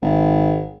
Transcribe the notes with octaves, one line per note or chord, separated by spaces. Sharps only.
G#1